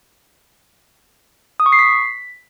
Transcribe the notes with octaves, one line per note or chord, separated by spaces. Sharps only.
D#6
C#6
C7
B6